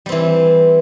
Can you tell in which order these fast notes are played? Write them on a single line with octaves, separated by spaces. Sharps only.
G3 C4 E3